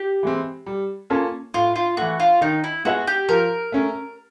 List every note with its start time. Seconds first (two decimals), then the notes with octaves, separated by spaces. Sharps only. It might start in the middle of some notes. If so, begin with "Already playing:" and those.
Already playing: G4
0.23 E3 G#3 C4
0.66 G3
1.10 A#3 C#4 F4 A4
1.54 A2 F4
1.76 F4
1.97 E3 A3 F#4
2.20 F4
2.41 D#3 D#4
2.64 E4
2.85 G#3 B3 E4 F#4 G#4
3.07 G4
3.29 F3 A#4
3.72 A3 C#4